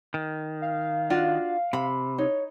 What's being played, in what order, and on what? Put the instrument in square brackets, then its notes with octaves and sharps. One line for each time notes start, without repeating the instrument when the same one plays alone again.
[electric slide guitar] D#3
[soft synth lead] F5
[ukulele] D4 F4 F#4
[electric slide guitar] C3 [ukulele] B5
[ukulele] D#4 [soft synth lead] C#5